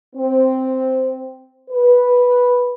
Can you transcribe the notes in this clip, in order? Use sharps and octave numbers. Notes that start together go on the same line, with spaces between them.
C4
B4